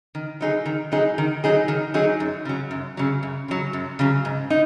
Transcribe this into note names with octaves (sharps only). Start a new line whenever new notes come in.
D#3
F#3 D#4 G#4
D#3
F#3 D#4 G#4
D#3
F#3 D#4 G#4
D#3
F#3 D#4 G#4
F#2
C#3 F#3
F#2
C#3 F#3
F#2
C#3 F#3
F#2
C#3 F#3
G#2
D#4